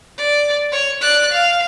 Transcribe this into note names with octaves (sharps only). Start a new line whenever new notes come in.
D5
C#5
D5 F#6
F5